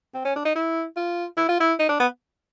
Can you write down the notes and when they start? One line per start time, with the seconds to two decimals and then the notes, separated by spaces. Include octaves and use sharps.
0.14 C4
0.25 C#4
0.36 D4
0.45 D#4
0.56 E4
0.97 F4
1.37 E4
1.49 F4
1.60 E4
1.80 D#4
1.89 D4
2.00 B3